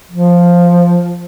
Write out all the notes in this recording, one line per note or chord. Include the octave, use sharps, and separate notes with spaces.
F3